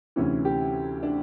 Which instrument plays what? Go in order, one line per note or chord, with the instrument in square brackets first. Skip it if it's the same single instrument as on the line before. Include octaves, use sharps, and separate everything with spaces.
[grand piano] D2 C3 E3 C#4
G4
D4